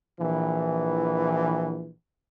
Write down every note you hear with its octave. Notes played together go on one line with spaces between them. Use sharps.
A#1 E3